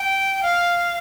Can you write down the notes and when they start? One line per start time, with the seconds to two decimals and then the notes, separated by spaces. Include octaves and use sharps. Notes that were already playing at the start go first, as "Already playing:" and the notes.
Already playing: G5
0.43 F5